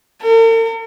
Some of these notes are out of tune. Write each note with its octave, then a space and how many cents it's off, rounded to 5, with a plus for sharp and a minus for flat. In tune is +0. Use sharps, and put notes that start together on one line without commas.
A#4 -45